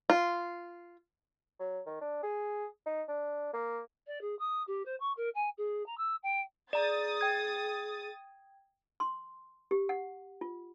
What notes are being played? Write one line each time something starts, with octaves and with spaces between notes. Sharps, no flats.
F4
F#3
D#3
D4
G#4
D#4
D4
A#3
D5
G#4
D#6
G4
C5
C#6
A#4
G#5
G#4
A#5
E6
G5
G#4 D5 A#5 D#6 A6
G5 G#6
C6
G4
F#5
F4